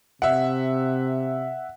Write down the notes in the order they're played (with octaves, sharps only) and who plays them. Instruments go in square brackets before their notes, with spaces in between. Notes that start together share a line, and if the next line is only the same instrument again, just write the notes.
[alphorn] C3 [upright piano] E5 F#5